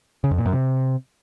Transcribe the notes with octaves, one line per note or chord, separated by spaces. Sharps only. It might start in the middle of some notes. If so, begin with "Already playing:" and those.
C#3
F2
A#2
F#2
C3